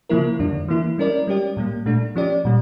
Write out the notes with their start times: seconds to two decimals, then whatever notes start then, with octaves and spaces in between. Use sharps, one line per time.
0.09 C#3 F3 A#3 E4 A#4
0.39 F2 D3 G3 D4
0.68 E3 A#3 E4
0.98 G3 C#4 E4 A#4 D5
1.27 G3 C#4 G4 D5
1.57 A2 G3 A#3
1.86 A#2 A3 D4
2.16 F3 C#4 G4 D5
2.45 A#2 G3